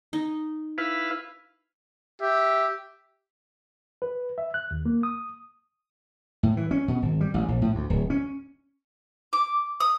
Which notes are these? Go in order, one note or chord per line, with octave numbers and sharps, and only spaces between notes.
D#4
E4 B4 F5
G4 E5
B4
E5
F#6
D#2
A#3
D#6
A2
E3
C#4
B2
G#1
G3
A1
A#1
A2
D2
D1
C#4
D6
D#6